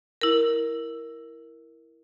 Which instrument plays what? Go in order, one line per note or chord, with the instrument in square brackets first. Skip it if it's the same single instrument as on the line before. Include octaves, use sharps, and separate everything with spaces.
[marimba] E4 A#4